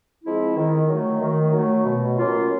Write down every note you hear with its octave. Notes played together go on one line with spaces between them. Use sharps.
F3 G#3 C4 E4
D#3
F#3 A3
D#3
F#3 A3
B2
F#3 A#3 C#4 F4